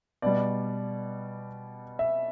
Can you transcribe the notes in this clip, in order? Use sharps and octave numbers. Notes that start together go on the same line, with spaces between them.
B2 G3 D5
E5